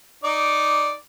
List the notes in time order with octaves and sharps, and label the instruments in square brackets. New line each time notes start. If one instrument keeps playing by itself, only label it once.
[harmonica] D#4 D5 D6